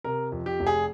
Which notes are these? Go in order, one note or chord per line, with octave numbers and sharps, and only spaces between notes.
C3 A#4
F2
G4
F1
G#4